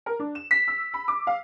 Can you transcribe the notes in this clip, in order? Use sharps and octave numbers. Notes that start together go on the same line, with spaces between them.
A#4
D4
E7
B6
E6
B5
D6
F5